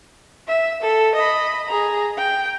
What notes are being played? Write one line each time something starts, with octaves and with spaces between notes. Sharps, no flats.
E5
A4
D#5 B5
G#4 A#5
G5